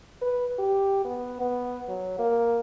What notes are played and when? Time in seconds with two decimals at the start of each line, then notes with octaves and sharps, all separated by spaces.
0.21 B4
0.59 G4
1.05 B3
1.41 B3
1.88 F#3
2.19 A#3